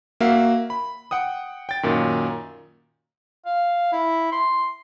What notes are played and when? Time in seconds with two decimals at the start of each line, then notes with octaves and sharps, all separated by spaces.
0.21 A#3 F#4 E5 F5
0.70 B5
1.11 F#5 G5 D#6
1.69 G5 A6
1.83 F#2 A#2 D#3
3.46 F5
3.93 E4
4.32 C6